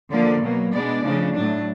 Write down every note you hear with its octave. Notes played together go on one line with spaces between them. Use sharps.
D3 F3 A#3 D5
B2 F#3 A#3
B2 G#3 B3 D4 D5
C#3 F3 A3 D4
A2 F#3 A3 D4